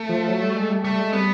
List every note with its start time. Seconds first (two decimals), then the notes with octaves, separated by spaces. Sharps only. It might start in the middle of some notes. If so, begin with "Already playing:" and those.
Already playing: A3
0.09 F3
0.28 F#3
0.42 G3
0.56 G#3
0.70 G3
0.84 G3 A3
0.99 G#3
1.13 G3 B3